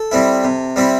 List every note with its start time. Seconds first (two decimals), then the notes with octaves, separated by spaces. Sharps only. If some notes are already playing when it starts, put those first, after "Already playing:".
Already playing: A4
0.12 G3 C4 E4
0.44 C3
0.76 G3 C4 E4